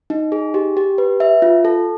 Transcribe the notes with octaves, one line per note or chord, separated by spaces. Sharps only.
D#4
G#4
G4
G4
B4
E5
F4
A4